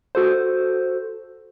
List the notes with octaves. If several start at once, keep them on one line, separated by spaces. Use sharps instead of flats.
F#4 A4 C5